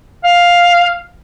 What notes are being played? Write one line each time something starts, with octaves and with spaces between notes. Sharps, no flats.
F5